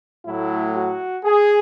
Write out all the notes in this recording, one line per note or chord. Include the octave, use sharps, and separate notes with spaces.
A2 F#3 A3 E4
F#4
G#4